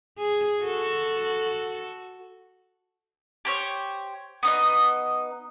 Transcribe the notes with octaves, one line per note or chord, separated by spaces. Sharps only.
G#4
F#4 A4
G4 C5 C#5
B3 D#4 D#5